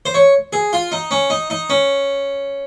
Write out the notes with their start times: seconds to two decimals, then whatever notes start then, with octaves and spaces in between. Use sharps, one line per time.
0.06 C5
0.14 C#5
0.53 G#4
0.73 F4
0.92 D#4
1.11 C#4
1.30 D#4
1.50 D#4
1.70 C#4